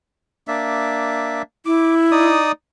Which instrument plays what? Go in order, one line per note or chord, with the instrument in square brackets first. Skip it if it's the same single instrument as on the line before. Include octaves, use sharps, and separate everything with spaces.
[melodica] A#3 D4 E5
[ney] E4 [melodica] D6
[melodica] D#4 D5 D#6